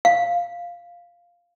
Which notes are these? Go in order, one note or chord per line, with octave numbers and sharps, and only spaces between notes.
F5